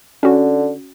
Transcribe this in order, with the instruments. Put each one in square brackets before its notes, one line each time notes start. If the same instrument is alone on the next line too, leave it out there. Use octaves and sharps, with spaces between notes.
[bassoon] D3 [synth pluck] C#4 F#4